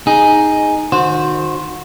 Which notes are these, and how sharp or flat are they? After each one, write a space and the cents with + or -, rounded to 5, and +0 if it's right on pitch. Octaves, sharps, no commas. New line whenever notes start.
D#4 +0 G#4 +0
D#3 -25 F#4 -30 C5 +0